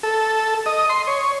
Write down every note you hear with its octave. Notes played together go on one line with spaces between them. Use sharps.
A4
D#5
C6
C#5